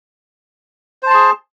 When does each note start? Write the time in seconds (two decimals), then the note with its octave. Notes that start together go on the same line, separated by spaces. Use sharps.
1.03 C5
1.07 A5
1.10 C6
1.14 G#4